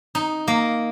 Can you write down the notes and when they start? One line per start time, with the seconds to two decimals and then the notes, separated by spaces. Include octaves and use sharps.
0.15 D#4
0.48 A#3